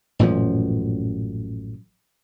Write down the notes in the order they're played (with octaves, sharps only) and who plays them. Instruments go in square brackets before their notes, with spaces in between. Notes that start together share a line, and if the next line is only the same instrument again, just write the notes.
[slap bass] A1 F#2 A#2 F3